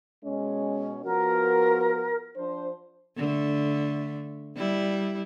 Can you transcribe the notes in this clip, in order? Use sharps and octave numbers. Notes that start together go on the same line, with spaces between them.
B2 G#3 C#4
F3 B3 F#4 A#4
F3 D4 C5
D3 A3
G3 E4